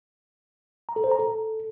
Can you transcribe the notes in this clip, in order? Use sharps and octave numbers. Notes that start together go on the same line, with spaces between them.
A#5
A4
C5
A#5
A4